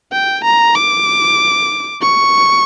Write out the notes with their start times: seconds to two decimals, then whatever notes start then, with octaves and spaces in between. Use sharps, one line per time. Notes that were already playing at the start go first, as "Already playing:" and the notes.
0.12 G5
0.44 A#5
0.75 D6
2.02 C#6